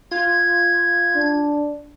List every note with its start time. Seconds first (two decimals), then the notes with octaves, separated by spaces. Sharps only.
0.11 F4 G#6
1.16 D4